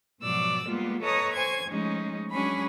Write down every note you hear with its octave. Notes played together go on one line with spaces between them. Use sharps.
G#2 B2 F3 F#3 D5 E6
G3 G#3 A#3 B3 F4
A4 B4 C#5 D#5 A#5 D#6
C5 G#5 C#6 G#6
F3 G#3 A3 C#4 D#4
F#3 G#3 C#4 D4 G#4 B5